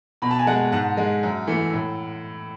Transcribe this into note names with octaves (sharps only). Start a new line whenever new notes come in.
B2 B5
A5
G#5
G#3 F#5 A5
G#2 F#5 A5
G#3
F#2
E3 A3
A2